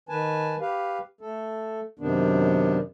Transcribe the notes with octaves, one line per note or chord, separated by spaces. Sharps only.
D#3 B4 G#5 A5
G4 B4 F5
A3 A4
F#2 C3 D#3 B3 D4